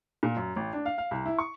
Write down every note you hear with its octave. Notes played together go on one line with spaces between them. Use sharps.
A#2
F#2
A1
D4
F5
F5
C2
E4
C#6